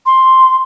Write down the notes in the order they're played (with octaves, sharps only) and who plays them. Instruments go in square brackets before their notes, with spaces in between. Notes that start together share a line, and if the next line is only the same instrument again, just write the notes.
[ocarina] C6